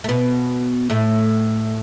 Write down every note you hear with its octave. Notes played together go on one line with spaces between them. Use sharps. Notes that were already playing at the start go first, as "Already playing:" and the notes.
A3
B2 B3
A2 A3